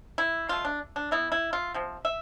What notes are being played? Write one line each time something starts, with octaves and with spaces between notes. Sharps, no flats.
E4
B2 A3 F4
D4
D4
E3 B3 E4
E4
F4
C3 F3
E5